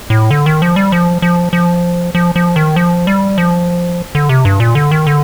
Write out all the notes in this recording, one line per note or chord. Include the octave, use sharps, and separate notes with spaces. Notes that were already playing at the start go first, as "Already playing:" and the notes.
A2
D3
D#3
F3
G3
F3
F3
F3
F3
F3
D#3
F3
G3
F3
D3
C3
G2
A#2
D3
D#3
D3